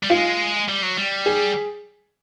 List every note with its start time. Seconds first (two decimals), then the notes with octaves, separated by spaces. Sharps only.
0.03 G3
0.10 G#3 F4
0.69 G3
0.83 F#3
0.97 G3
1.26 G#4